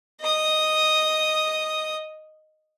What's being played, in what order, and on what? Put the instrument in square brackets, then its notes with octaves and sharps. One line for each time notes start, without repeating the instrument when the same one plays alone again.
[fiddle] D#5 D#6